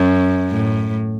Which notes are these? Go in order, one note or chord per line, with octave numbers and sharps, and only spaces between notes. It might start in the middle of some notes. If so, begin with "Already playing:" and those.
Already playing: F#2
A2